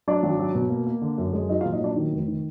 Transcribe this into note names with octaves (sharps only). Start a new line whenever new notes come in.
F#3 D4 D5
G#1
F#3
B2
A#3
A#3
D3
F#2
G#3
F#3 D#4 D#5
F4 F5
A#1
D#4 D#5
F#3 D4 D5
D#3
F1
D#3